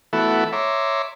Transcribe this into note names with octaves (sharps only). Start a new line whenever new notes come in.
E3 A3 B3 E4 F#4 A4
C#5 E5 A#5 C6 D6